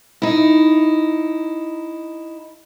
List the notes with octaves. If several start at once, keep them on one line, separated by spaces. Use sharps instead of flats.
D#4 E4